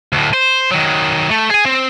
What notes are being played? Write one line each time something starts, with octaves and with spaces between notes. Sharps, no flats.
D2 A2
C5
D#3 F#3
A3
G#4 G#5
C4